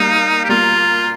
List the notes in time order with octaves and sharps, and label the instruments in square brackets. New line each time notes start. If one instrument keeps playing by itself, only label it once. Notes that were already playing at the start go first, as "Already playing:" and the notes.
Already playing: [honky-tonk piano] G3 A#3 [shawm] D#4
[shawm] G4
[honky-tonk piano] G3 A#3 [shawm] F4